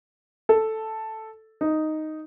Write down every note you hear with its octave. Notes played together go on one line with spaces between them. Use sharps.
A4
D#4